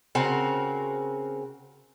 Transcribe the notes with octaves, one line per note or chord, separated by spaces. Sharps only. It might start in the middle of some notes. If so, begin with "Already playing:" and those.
C#3 C4 F#4 A#4